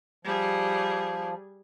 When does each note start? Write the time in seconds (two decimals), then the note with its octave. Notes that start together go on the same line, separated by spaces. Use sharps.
0.25 F3 G3 G#4